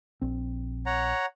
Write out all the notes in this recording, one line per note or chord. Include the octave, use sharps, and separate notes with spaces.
A#1 C4
C#5 F#5 A#5